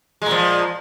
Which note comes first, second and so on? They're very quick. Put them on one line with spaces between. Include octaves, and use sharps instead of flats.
G#3 A#2 F3